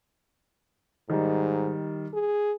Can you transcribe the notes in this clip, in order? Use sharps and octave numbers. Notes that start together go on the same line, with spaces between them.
G#2 D#3 G3
G#4